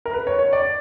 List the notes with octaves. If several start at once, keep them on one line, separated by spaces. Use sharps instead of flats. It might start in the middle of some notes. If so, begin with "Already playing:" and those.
A#4
B4
C#5
C#5
D5